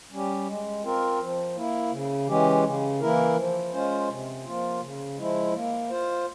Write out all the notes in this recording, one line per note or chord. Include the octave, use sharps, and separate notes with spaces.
G3 C#4 G4
G#3
C4 F4 A#4
F3
A#3 E4
C#3
E3 G#3 C#4 G4
C#3
E3 A#3 E4 A#4
F3
G#3 C#4 F4 C5
C3
F3 A#3 F4
C#3
F3 G#3 E4
A#3
F4 C5